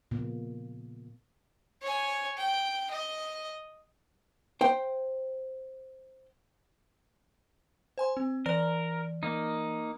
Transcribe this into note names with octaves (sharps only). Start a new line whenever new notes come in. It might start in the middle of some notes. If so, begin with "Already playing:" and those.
A#2 C#3 A#3 B3
C#5 G#5
G5
D#5
C5 G5
C5 G#5 C6
C4
E3 A#4 D5 F6
A#3 D#4